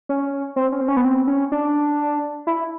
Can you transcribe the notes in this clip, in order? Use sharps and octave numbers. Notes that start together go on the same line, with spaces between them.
C#4
C4
C#4
C4
C#4
B3
C4
C#4
D4
E4